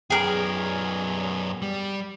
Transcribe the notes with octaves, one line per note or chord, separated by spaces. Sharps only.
F#2 B3 G#4 A#4
G3